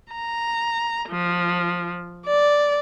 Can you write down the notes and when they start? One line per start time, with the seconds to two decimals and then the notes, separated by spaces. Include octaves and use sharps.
0.12 A#5
1.10 F3
2.26 D5